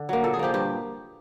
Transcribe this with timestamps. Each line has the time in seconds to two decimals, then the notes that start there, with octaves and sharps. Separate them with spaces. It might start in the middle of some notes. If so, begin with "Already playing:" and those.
Already playing: D3
0.09 F#3 A#3
0.24 A#2 A4
0.34 G#4
0.39 F3 A#3 G4
0.54 G2 G4